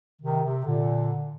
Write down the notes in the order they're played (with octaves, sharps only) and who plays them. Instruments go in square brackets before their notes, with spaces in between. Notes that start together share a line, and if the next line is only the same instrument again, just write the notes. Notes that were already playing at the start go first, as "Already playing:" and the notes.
[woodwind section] C3 D#3
C3
A#2 D3